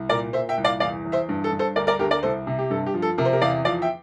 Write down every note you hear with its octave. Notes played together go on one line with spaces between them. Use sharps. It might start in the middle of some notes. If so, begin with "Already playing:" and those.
Already playing: C2
A#2 A#4 D5
A#2 C5 E5
E5 G5
C2
D5 F5
E2 D5 F5
E2
C5 E5
G2
A4
G2
A4 C5
D2 A#4 D5
A#4 D5
D2 G4 A#4
A#4 D5
C2 A4 C5
C3
G4
G2 A4
G4
F3
A4
C3 A#4
C5
G4 A#4
E2 D5 F5
F3 D5 F5
E5 G5